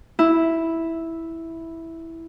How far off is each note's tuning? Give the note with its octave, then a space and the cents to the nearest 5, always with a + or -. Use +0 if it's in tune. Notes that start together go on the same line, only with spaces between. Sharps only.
E4 -5